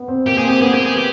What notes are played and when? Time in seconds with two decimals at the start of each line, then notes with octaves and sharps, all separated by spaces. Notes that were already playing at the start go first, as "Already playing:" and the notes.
Already playing: B3
0.08 C4
0.26 A#3 G4
0.38 G#4
0.44 C4
0.50 G4
0.61 B3 G#4
0.74 G4
0.85 G#4
0.97 G4